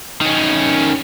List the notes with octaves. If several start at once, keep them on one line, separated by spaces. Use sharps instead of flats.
D#3 C#4